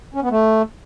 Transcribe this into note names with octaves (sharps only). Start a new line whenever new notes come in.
C#4
B3
A3